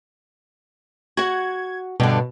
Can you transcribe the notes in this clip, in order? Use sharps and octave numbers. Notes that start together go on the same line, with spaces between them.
F#4 F#5 G#6
G2 B2 D3